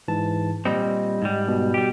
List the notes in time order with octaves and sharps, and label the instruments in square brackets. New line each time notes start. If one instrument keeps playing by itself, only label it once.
[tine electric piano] G#2 E3 A5
[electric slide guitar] A#2 G3 C4 [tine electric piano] D#5
[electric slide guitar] G#2 G3
[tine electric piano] B2
[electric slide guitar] G3 G4